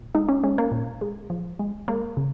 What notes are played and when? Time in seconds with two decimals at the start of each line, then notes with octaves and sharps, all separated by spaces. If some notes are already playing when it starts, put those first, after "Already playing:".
Already playing: A#2
0.15 G#3 D#4
0.29 C#4
0.43 G#3 C#4
0.58 A#3
0.72 A#2
1.01 G#3
1.30 F3
1.59 G#3
1.88 G#3 A#3
2.17 C#3